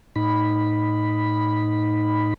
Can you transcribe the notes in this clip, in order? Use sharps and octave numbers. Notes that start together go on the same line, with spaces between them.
A2 D#4 B5